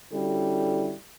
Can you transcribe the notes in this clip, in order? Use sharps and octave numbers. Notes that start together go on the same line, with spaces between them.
D3 G3 C#4 E4 F#4 A4